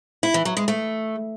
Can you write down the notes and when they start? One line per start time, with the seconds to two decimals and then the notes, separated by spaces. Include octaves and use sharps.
0.23 E4
0.34 E3
0.45 F#3
0.57 G#3
0.68 A3